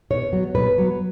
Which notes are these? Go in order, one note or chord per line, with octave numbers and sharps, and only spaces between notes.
B2 C#5
F#3 B3
B2 B4
F#3 B3